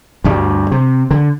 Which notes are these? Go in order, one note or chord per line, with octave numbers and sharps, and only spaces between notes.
D2 G2 G3
C3
D3